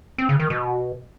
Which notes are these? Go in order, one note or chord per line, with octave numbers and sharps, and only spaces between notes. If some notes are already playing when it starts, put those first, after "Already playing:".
C4
C#3
D#3
B2